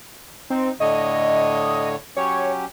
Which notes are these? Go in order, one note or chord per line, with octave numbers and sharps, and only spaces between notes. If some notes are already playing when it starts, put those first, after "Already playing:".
C4 D#4
A2 D3 C#5 D#5
F#3 C#4 G4 C#5